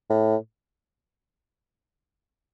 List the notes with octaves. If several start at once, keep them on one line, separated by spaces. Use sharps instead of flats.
A2